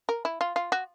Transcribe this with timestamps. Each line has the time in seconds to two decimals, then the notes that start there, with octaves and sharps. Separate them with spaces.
0.09 A#4
0.25 E4
0.41 F4
0.56 F4
0.72 F#4